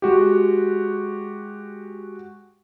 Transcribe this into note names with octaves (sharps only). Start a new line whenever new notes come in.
G#3 F#4 G4